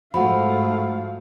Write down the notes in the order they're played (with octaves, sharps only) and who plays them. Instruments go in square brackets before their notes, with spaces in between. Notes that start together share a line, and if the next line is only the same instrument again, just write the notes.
[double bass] G#2 A3 [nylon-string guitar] F3 F#4 [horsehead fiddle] F5 [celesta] F#5 B5